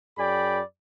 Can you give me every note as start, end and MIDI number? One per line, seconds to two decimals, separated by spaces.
0.18 0.61 42
0.18 0.61 68
0.18 0.61 74
0.18 0.61 79
0.18 0.61 83